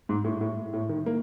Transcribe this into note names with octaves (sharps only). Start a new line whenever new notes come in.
G#2
A2
A2
A2
D#3
A#3